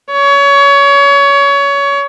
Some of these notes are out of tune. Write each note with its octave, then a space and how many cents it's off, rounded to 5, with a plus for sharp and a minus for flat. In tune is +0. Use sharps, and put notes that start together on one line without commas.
C#5 +25